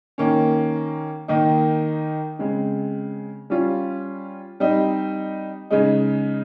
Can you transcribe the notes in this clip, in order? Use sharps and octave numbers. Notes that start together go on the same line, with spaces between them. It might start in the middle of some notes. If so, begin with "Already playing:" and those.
D#3 A#3 C#4
D#3 A#3 D#4
C#3 G#3 C4
G3 C#4 F4
G3 C4 D#4
C#3 G#3 D#4